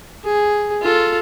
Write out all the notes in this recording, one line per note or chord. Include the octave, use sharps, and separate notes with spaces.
G#4
F4 A4